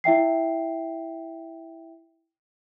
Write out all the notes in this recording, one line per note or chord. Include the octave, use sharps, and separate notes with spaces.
E4 E5 G5 C7